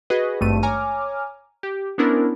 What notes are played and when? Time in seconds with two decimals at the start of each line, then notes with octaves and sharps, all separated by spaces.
0.10 F#4 G#4 B4 D#5
0.41 G#1 G2 A3 D#7
0.63 C#5 G#5 A#5 D6 F6
1.63 G4
1.98 B3 C#4 D4 E4 A#4 C5